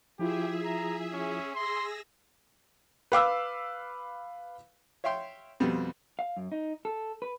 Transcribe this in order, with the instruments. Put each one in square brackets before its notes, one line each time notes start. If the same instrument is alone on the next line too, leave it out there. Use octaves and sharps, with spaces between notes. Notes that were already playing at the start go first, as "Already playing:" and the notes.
[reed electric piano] F3 E4 F4 [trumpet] G4 [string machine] G#4 E5
[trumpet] A#5
C#4
[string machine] G#4 E6 A#6 [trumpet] C6
[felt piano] B4 F5 D6 E6
[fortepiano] C#5 E5 F5 G5 C6
F2 B2 G3 B3 C4
[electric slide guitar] F5
F#2
D#4
A4
B4